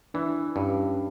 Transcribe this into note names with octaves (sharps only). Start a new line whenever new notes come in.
E3 D4
G2 C#4